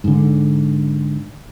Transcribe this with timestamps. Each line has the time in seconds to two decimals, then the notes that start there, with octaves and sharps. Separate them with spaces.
0.04 G#2 D3